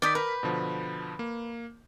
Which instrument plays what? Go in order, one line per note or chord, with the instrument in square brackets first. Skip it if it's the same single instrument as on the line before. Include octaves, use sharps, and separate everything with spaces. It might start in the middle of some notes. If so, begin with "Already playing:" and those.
[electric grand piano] D#3 G6 B6 [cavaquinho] D5 D#6
[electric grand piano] A#4 [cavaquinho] B4
[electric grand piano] B2 D3 F3
A#3